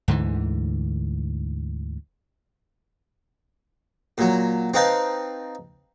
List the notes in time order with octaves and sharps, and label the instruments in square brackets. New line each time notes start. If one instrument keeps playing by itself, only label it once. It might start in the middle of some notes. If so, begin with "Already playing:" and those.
[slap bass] D2 G#2 D3 E3
[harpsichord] A#2 F#3
C4 D#4 B4 F5 A5